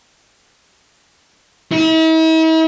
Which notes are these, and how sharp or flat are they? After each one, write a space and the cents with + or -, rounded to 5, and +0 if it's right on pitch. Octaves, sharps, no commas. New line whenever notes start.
E4 -45